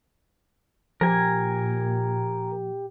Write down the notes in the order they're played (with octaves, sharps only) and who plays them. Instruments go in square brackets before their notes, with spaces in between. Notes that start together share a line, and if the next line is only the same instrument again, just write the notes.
[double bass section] A#2 [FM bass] F3 [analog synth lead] G4 [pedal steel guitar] A#4 G#5